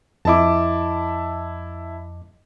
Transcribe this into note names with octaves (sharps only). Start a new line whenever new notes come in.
F2 E4 D#5 A5 D6